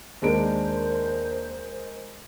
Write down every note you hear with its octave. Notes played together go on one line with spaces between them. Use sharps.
D#2 G#3 D4 A#4 C5 D7